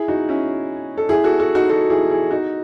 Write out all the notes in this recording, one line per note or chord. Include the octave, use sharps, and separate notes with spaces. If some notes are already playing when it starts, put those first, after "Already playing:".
Already playing: E4 G#4
D#4 F#4
C#4 E4
A4
E4 G#4
F#4 A4
F#4 A4
D#4 F#4
F#4 A4
E4 G#4
E4 G#4
D#4 F#4